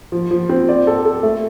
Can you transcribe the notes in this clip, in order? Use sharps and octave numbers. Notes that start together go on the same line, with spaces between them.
F3
F3
C4
D5
A4
A4
A3